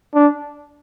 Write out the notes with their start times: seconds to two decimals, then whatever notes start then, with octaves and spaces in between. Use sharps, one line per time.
0.15 D4